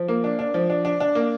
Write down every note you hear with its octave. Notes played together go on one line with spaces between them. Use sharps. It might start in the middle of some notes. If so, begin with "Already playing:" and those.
Already playing: F3
A#3
D4
D4
F3
D4
D4
D4
A#3